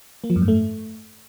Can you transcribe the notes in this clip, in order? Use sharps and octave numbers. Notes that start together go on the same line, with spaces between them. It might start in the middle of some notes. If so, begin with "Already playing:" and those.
A#3
F3
F#2
G#2
A3